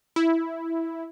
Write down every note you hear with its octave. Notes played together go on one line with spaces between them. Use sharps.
E4